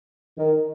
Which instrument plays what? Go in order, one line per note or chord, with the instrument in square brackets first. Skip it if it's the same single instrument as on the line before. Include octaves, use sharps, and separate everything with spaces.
[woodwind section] D#3